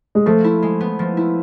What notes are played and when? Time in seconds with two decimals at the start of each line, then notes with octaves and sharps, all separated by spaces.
0.15 G#3
0.26 F3 A3
0.44 E4
0.62 G#3
0.81 B3
0.99 F3
1.17 E4